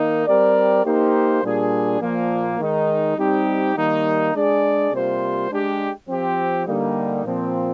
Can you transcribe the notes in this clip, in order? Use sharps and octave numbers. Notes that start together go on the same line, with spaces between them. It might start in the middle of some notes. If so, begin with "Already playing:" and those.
Already playing: D#3 A#3 D#4
G3 C4 G4 A#4 D5
A#3 D#4 G4 C5
A#2 G3 D4 G#4
A#2 F3 A#3
D#3 G#3 D#4
G3 C4 D#4 G4
D#3 G3 A#3 D#4
G#3 D4 G#4 D5
C3 G3 A#3 F4 C5
G#3 D4 G4
F3 C4 G4
D3 G3 A#3 D#4
A#2 F3 C4